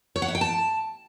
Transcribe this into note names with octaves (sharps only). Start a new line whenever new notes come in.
C#5
F#5
E4
G5
A5